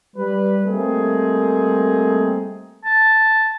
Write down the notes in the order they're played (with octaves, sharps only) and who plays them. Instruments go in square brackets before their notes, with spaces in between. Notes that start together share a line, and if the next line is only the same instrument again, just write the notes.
[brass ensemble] G3 B4
G3 A3 A#3 C4 D#4 G#4
[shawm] A5